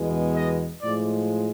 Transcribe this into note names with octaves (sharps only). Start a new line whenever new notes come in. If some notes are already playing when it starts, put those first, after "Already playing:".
Already playing: E2 B2 G#3
D#5
A2 F3 G#3 D5